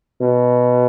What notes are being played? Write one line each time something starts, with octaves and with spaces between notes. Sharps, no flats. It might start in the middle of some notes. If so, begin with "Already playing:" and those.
B2